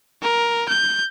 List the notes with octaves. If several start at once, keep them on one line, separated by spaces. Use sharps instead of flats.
A#4
G6